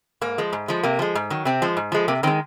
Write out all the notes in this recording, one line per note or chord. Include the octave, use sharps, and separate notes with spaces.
G#2 A#3
F3 G#3
G#2
F3 G#3
C3 A#3
F3 G#3
G#2
D#3 F#3
C3 C4
F3 G#3
G#2
F3 G#3
C3 A#3
D#3 G#3 C4